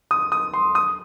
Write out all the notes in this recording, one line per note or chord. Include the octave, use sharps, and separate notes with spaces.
D#6
D#6
C6
D#6